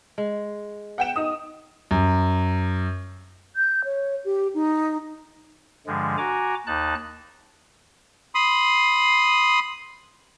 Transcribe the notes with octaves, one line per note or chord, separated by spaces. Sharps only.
G#3
F#5 G5 E7
D#4 D#6
F#2
G6
C#5
G4
D#4
G2 D3 F3 G#3
F#4 G#5 A#5 D6
D#2 D#4 A5 F#6
B5 C6 D#6